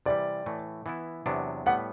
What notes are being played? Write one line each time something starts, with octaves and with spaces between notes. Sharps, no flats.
C3 E3 G3 D5
A2 E3 A3
E3 B3 E4
E2 C3 F#3 B3 D4
A2 G3 B3 F#5